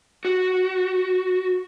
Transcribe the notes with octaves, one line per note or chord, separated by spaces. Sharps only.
F#4